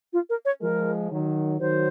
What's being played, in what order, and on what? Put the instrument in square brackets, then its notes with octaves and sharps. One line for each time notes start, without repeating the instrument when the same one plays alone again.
[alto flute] F4
A#4
C#5
[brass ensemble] F3 G#3 [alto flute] A#4
[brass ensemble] D#3 F#3
[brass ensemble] D#3 F#3 [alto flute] C5